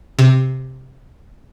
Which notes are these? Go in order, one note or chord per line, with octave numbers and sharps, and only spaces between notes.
C3